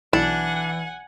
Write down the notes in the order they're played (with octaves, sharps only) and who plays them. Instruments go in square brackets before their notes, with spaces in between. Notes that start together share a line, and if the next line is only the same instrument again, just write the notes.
[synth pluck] B1 E4 E7 [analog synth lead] E3 [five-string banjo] D4 [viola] F#5 G#5